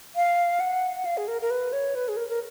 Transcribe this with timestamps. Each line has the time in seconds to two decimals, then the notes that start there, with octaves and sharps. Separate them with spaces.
0.16 F5
0.60 F#5
1.05 F5
1.17 G#4
1.28 A#4
1.42 A#4
1.50 B4
1.73 C#5
1.95 B4
2.08 G#4
2.17 A#4
2.29 A#4